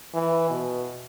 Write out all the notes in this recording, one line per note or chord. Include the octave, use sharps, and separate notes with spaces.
E3
B2